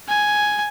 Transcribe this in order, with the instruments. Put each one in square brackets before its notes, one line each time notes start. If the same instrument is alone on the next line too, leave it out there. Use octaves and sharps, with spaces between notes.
[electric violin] G#5